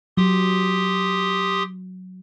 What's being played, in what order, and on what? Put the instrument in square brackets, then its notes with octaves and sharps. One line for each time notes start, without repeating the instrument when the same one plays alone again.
[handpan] F#3 [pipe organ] G4 C6 D#6